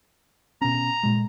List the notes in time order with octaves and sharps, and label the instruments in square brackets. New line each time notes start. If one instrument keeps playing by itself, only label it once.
[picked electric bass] B2 C#4 [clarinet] A#5
[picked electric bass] A#2 G#3